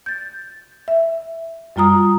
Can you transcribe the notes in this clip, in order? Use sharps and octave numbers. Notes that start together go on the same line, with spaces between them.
G6 A6
E5
F#2 G3 F4 A#5 D#6